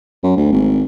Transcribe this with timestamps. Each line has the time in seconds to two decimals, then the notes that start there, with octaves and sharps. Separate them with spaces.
0.23 F#2
0.37 D2
0.52 G#1